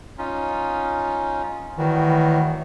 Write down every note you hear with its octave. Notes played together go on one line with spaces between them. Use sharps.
C#4 D#4 F4
A2 D#3 E3 G3 F#4